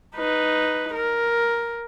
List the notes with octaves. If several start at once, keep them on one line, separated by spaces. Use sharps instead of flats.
D#4 B4
A#4